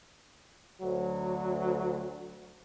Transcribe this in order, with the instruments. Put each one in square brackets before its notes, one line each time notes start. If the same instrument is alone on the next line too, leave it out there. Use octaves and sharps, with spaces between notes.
[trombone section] D2 F#3